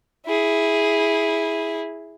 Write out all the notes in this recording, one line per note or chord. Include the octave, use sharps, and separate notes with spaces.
E4 G#4